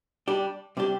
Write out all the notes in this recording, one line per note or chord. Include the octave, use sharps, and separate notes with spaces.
G3 D4 G4
C3 G3 D4 G4